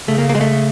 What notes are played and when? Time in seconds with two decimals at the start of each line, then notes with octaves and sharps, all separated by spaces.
0.08 C#3 A3
0.18 A#3
0.29 A#3
0.35 G#3
0.41 A3